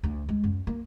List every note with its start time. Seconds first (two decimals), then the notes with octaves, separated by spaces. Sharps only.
0.03 D2
0.29 G#3
0.44 F#2
0.67 A#3